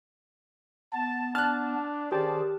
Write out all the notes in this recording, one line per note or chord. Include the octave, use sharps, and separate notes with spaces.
B3 A5
D4 A5 F6 F#6
D#3 C#4 G4 G#4 C5 D5 A5